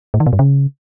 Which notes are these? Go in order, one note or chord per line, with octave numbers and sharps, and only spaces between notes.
A2
D#3
B2
G2
C#3